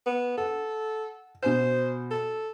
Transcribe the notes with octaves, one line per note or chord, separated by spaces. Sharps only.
B3
A4 F#5
B2 C5 G#5 E7
A4